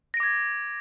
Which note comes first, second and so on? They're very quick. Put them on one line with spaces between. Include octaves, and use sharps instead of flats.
A#6 D7 D6 G#6